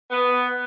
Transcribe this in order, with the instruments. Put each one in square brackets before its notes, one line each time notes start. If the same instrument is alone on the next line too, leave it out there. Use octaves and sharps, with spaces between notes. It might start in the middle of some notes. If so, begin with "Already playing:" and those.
[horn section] B3